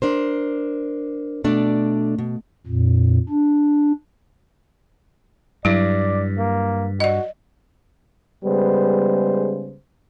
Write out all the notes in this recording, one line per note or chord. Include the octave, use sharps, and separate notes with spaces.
D4 A#4 C5
B2 A3 D4 D5
B2
F2 A#2
D4
G2 F#3 E4 D5
A#3
F#4 D5 D#5
C#3 G3 G#3 B3 C5